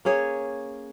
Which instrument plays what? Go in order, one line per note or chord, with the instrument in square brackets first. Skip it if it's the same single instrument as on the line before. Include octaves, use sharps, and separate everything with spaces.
[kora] A#3 C#4 G#4 C#5